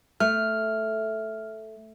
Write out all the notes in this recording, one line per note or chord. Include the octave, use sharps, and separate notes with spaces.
A3 F6